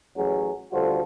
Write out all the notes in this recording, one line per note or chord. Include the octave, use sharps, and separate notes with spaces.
A1 F#3 G#4
D2 G3 F4 F#4 A4 C5